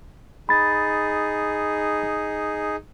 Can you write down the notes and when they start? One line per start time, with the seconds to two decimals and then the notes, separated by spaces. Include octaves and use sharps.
0.49 D#4 G#4 B5 A6